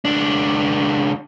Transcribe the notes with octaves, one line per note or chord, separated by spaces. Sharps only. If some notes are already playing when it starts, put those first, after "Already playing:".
C#2 D4